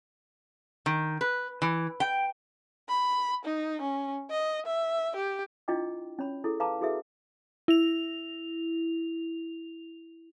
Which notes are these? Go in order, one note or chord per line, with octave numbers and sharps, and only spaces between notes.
D#3
B4
E3
G5
B5
D#4
C#4
D#5
E5
G4
D4 E4 F4 D#5 G5 D6
C#4 C#5 B5
E4 G#4 A4
B4 F5 A5 A#5 D6
E4 F#4 G#4 A4 B4 E5
E4 F7